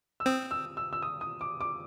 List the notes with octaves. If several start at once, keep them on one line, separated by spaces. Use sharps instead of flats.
E6
C4 D#6
E6
E6
E6
D#6
D#6
D6
D6